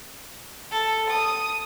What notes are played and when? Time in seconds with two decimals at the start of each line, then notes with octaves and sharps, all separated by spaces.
0.71 A4
1.09 D#6